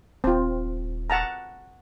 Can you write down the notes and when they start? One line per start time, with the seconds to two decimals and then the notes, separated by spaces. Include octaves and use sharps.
0.24 D#1 C4 F4
1.10 F#5 A5 A#5